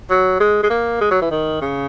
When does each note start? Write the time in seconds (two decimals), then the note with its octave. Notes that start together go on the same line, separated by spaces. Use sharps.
0.10 F#3
0.40 G#3
0.63 G#3
0.70 A#3
1.01 G#3
1.11 F#3
1.21 E3
1.31 D#3
1.61 C#3